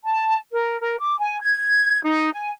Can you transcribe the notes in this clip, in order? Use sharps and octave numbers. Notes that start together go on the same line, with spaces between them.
A5
A#4
A#4
D6
G#5
G#6
D#4
G#5